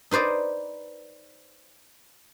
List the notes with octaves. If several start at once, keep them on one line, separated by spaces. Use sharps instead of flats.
D#4 B4 C5 D5 D#5